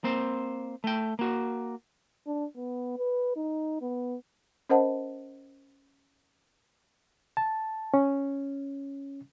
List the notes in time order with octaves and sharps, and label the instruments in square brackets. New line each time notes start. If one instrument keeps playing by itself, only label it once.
[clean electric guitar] A#3 C4 C5
A3 G5
A#3 F#4
[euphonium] D4
B3
B4
D#4
B3
[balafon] C#4 A#4 C5 D#5 F#5 A5
[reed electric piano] A5
C#4